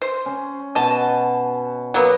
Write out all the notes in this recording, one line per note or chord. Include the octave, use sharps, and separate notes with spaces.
C5
C#4
B2 F#4 D#5 A5
F#3 A#3 B3